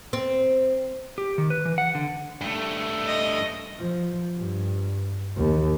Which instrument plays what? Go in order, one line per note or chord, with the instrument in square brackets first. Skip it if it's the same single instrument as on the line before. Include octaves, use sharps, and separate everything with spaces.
[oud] C4
[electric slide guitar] G4
D#3
B4
E3
F#5
D3
[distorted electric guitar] G2 A3
[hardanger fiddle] D#5
[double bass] F3
G2
D#2